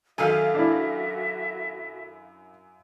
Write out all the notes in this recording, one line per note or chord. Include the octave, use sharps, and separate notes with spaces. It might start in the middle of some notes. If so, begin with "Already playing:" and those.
F#2 D#3 F#4 A4 E5 F5 G#5
D4 E4